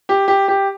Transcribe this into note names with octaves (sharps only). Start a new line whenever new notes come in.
G4
G4
G4